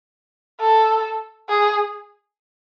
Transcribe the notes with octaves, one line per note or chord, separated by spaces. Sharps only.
A4
G#4